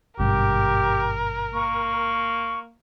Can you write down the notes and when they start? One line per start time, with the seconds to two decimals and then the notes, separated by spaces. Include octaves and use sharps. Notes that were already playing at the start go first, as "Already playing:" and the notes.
0.19 G#1 G2 B2 G4 A#4
1.54 A#3 C#6